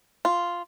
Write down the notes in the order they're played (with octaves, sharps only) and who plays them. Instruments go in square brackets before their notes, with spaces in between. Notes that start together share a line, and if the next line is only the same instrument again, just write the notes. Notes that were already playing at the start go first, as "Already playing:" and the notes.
[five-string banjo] F4